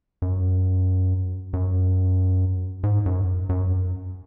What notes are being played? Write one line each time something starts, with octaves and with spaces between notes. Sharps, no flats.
F#2
F#2
G#2
F#2
F#2